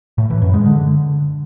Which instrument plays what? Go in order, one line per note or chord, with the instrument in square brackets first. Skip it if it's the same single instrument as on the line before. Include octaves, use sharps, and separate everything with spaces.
[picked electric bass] A2
E3
F#2
G#3
D3